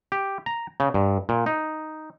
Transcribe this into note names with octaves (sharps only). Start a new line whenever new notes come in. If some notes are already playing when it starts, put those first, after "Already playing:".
G4
A#5
C#3
G2
A#2
D#4